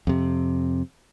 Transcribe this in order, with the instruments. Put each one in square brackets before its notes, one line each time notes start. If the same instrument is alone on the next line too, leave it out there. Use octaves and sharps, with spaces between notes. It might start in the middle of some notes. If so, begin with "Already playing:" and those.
[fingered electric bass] F2 C3